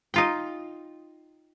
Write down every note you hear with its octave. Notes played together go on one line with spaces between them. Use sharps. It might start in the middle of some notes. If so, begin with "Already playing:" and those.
D#4 F4 G5